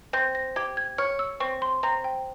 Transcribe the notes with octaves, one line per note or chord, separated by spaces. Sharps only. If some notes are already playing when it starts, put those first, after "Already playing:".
C4 G6
A#6
G4 G#6
G#6
C#5 F6
E6
C4 C#6
C6
C4 A#5
G5